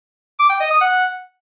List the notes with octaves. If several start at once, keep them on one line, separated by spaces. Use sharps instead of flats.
D6
G5
D#5
D#6
F#5